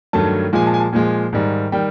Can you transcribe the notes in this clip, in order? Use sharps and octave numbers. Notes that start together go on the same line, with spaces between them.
G2 D#3 F#3 A3 A5
A#2 F3 G#3 G#5
A5
G#5
A5
A#2 F3 G#3 G#5
G#2 D#3 G3
D#3 G3 G5